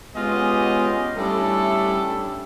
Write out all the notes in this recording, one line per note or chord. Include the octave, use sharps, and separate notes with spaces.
G#3 B3 C#4 F4 G4 D#5
G3 A3 C#4 D4 E4 A4